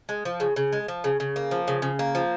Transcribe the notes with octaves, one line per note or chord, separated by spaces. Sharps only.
G#3
F3
C#3
C#3
G#3
F3
C#3
C#3
A#3
F3
C#3
C#3
A#3
F3